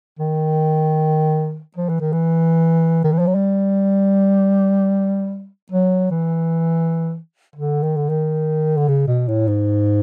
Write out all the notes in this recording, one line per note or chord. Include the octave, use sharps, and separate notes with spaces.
D#3
F3
E3
D#3
E3
D#3
E3
F3
F#3
G3
F#3
E3
D3
D#3
D3
D#3
D3
C#3
B2
A2
G#2